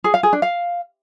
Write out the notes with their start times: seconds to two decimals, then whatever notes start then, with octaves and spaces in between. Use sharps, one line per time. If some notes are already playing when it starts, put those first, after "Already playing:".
0.04 G#4
0.14 F5
0.23 G#4
0.33 D4
0.42 F5